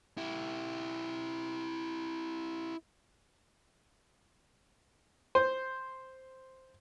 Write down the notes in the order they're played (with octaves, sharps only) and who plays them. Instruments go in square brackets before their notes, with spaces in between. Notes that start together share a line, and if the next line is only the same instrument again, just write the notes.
[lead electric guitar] E4 G4
[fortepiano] C5